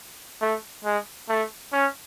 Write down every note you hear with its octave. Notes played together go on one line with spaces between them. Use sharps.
A3
G#3
A3
C#4